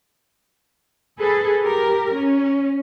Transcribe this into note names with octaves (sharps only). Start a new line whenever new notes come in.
G#4 A4 B4
G4 A#4
C#4